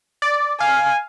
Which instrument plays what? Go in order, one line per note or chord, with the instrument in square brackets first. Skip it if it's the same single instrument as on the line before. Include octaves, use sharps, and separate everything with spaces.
[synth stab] D5
[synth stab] F5 [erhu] G#5